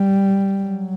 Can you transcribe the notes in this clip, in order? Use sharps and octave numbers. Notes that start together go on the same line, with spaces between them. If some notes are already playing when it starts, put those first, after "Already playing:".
Already playing: G3
F#3